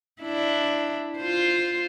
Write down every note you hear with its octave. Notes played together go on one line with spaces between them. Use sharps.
D4 E4
F4 C5